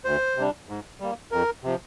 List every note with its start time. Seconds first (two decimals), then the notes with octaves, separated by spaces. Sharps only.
0.05 D2 C5
0.37 C3 G3 D4
0.69 G#2
1.00 G3 A#3
1.31 F2 A#4
1.64 C3 F3